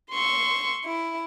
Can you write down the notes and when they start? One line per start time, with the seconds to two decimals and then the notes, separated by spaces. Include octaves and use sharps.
0.12 C6 C#6 E6
0.85 E4